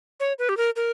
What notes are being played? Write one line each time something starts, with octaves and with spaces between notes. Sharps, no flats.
C#5
B4
G4
A#4
A#4